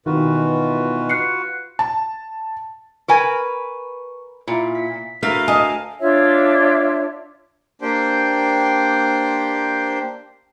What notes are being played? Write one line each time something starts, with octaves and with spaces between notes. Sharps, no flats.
B2 D#3 E3 F4 F#4 B4
F#6 C7 C#7
A5
A#4 B4 G#5 C#6
A#2 E4 F4 E5
B6
D2 A3 A#4 B4 F5
D#5 G#5 A5
D4 F4 C#5 E5
A#3 D4 G4 C5 G5